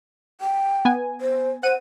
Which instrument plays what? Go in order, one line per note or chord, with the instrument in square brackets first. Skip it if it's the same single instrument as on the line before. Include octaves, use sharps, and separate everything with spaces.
[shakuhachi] G5
[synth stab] B3 G#5
[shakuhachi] C5
[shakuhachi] C5 [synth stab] F#5 D#7